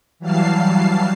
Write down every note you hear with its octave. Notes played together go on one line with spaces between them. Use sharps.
E3 F#3 G3 F5 A5 C7